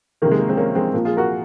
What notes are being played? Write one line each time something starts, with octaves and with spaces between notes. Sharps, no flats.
C3 D#3 A#3
G#3
A#3
G#3 C4
A#3 C#4
G#3 C4
A#2 F3 A#3
F4 G#4
F#4 A#4